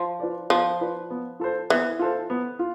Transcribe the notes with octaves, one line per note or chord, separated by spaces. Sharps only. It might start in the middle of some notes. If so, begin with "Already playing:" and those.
Already playing: F3
F4 B4 D5
F3 B3
F4 B4 D5
B3
F4 A4 C5
E3 B3
F4 A4 C5
B3
F4